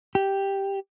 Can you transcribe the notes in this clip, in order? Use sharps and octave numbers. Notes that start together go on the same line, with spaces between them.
G4